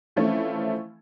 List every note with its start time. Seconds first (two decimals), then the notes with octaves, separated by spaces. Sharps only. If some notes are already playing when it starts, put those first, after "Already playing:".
0.16 E3 F3 A3 C4 C#4 E4